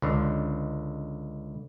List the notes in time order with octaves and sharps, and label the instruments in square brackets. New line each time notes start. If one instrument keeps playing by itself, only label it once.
[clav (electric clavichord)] C#2 D3